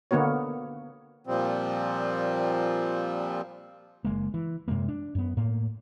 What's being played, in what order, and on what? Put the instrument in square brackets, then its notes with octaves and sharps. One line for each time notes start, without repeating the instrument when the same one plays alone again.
[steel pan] D3 A#3 B3 F#4 C#5
[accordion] A#2 F3 G3 C4
[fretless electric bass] F#1 G#3 A#3
E3
F#2 C3 G#3 A#3
D4
F#2 B3
A2 A#3